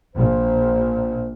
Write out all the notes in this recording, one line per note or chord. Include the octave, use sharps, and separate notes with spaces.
A#1 A#2 C5